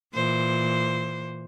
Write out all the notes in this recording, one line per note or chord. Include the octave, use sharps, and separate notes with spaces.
A#2 E3 C5